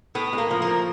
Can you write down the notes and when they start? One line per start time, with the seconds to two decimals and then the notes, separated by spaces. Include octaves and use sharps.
0.15 A2 B3
0.33 G#3
0.38 A#3
0.50 F3
0.62 A#3
0.67 A2